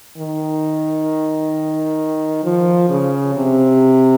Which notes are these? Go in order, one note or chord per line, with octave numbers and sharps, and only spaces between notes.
D#3
F3
C#3
C3